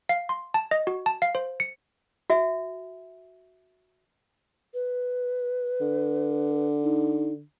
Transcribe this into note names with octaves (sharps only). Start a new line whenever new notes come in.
F5
C6
A5
D#5
F#4
A5
F5
C5
C#7
F#4 E5
B4
D3
D#4